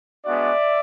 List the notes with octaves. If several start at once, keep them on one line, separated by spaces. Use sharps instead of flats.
G#3 B3 D4 F#4 D5 E5